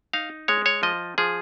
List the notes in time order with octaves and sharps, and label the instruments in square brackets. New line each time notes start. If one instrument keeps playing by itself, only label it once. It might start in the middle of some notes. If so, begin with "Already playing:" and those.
[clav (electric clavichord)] D#4 F5
G#3 C#5
C#5
F3 D#5
F3 G#4